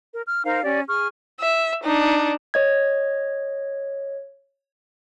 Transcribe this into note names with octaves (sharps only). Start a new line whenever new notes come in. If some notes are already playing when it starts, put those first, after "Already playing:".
A#4
F6
D#4 A#4 C5 F5
C#4 G4 D5
G#4 C#6 F6
E5
D4 D#4
C#5 D#5 G#6